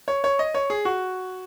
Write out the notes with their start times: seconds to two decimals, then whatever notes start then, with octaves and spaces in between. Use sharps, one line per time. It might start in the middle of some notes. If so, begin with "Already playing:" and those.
0.08 C#5
0.24 C#5
0.39 D#5
0.54 C#5
0.70 G#4
0.85 F#4